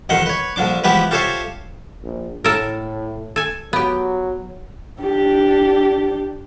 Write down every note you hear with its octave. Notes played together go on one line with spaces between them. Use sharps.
A1 F2 D#3 D#4 F#5 C6
B4 C#5
A#1 D3 F3 D4 D6
E3 F3 G#3 B3 G4 B4
F4 G4 A4 C5 C#5 E5
A#1
A2 A4 A#4
A4 G#5
F#3 B3 G4
D4 G4